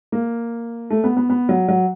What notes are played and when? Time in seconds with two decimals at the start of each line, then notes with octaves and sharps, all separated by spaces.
0.12 A#3
0.90 A3
1.04 B3
1.17 B3
1.30 B3
1.49 F#3
1.68 F#3